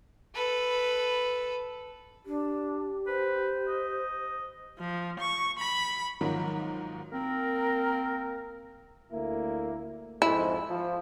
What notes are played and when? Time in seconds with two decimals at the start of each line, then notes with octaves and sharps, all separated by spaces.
0.34 A4 B4
2.26 D4 G4
3.06 B4 C5
3.68 D#5
4.79 F3
5.19 C#6
5.58 B5
6.21 G#2 D#3 F3 F#3 A#3
7.12 A#3 C4 A#4
9.12 D2 A#3 E4
10.22 F2 G#2 E4
10.70 F3